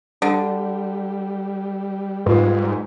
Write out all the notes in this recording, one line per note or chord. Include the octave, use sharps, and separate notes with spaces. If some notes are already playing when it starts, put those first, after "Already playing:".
D3 G3
G#2 G3 F4 A4 B4